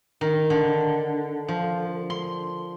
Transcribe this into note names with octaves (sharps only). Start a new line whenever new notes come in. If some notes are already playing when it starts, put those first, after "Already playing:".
D#3
D3
F3
C6